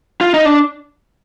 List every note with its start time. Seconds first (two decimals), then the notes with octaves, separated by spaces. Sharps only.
0.21 F4
0.34 D#4
0.45 D4